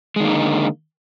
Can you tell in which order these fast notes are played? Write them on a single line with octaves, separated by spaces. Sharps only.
G#3 D#3 A#3 D#4 D3